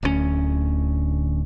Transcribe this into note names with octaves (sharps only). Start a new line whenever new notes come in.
D1 D2 G#3 C#4